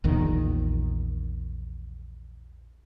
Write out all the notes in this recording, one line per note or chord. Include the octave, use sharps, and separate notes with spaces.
A#1 E2 D#3